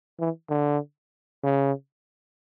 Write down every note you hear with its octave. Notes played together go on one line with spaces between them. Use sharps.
E3
D3
C#3